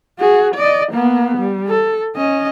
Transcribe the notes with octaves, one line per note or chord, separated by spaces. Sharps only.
F#4 G#4
D5 D#5
A#3 B3
G3
A4
C#4 D#5